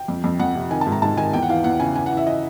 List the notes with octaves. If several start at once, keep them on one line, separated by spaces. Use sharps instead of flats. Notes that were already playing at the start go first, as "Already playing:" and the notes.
Already playing: G5
F2
F2
F2 F#5
C3
D#3 G#5
A5
G#2
A#5
G#2 A5
D#3 G#5
E2 G5
F#5
E3 F5
E2 F#5
C#3 G#5
E3 G#5
F#5
E3
E5
D#5